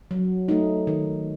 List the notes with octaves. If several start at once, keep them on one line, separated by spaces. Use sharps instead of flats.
F#3
A3 D#4
D#3